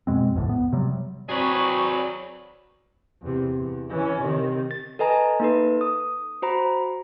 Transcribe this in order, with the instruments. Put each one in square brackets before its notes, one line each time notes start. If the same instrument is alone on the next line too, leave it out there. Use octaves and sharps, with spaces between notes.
[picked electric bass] F2 B2 G#3 C4
A#1 E2 A2 D3
B3
C3 F#3 G3
[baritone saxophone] F#3 [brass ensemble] C4 D5 [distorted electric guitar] G#4 B4 [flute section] C#6
[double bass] E2 C3
E2
E3 C#4
C3 D#3
[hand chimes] A6
A4 B4 D#5 G#5 A#5
A#3 D#4 A4 B4
D#6
F#4 C5 A#5 B5